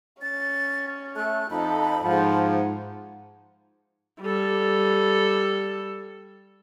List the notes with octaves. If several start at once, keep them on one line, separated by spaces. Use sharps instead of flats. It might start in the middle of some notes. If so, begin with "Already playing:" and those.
C#4 A6
A3 F#6
F2 D#4 A4 B5
G#2 F3 F#5
G3 A4